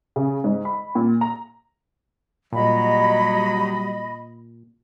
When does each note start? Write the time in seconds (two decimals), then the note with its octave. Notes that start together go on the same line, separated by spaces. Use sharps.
0.16 C#3
0.44 G#2
0.65 B5
0.95 A#2
1.21 A#5
2.53 A#2 F#3 G3 D#5 B5